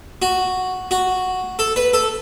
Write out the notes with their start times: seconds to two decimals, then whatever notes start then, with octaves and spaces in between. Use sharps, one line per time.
0.22 F#4
0.91 F#4
1.59 A4
1.76 B4
1.93 A4